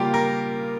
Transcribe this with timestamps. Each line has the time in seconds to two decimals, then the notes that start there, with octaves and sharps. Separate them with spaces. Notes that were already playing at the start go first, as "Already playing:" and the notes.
Already playing: C#3 G3 A#3 F4 G4
0.14 A#4